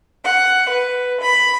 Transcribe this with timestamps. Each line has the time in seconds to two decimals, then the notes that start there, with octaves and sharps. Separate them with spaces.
0.24 F#5
0.69 B4
1.21 B5